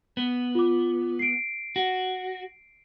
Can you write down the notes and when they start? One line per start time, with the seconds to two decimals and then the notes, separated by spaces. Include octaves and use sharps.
0.17 B3
0.55 F4 D6
1.19 C7 D7
1.76 F#4